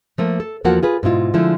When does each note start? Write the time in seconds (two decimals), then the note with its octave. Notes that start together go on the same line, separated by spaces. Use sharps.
0.18 F3 A3 A#3
0.40 A4
0.64 E2 F3 A#3 F#4 A4 F#5
0.83 F4 G#4 B4
1.03 G#2 B2 E4 F4
1.34 D3 F3 G#3 A3 E4